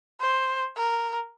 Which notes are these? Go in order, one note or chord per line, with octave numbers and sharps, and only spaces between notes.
C5
A#4